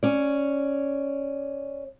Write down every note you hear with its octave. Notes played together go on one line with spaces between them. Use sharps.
C#4 D5